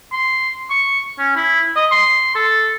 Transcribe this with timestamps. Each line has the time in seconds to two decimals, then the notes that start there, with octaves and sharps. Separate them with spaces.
0.13 C6
0.70 C#6
1.19 C#4
1.36 E4
1.76 D#5
1.92 C6
2.35 A4